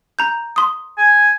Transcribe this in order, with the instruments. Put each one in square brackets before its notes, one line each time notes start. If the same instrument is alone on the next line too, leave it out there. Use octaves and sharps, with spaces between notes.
[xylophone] A#5 G6
C6 D#6
[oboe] G#5